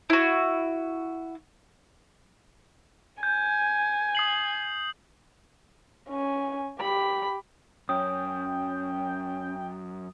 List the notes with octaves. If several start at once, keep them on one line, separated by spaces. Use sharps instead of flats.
E4 F#4
G#5 G6
D#6 C7 F#7
C#4 G#5
G4 B5
F#2 C#4 G5 D#6